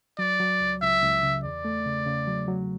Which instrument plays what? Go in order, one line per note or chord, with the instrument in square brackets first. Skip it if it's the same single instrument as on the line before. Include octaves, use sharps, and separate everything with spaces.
[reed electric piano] F#3 [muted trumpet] D5
[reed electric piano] F#3
C#2
[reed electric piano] C#2 [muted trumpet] E5
[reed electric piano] C#2
C#3
[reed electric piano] E2 [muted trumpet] D5
[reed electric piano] A3
C#3
C#3
F#3
F#3